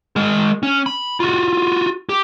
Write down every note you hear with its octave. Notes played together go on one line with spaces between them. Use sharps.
G#3 A#4
C#4
B5
F4 F#4
G4